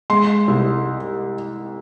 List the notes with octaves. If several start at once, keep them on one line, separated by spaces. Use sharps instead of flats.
G#3 C6
C2